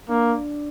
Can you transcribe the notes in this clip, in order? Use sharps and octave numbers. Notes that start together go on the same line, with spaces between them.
A#3 D4